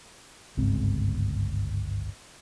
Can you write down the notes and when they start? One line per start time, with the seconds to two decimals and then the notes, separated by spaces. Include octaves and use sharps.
0.57 G1 C#2 G#2 C4